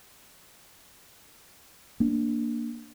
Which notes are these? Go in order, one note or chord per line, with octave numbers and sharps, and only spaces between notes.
A#3 D4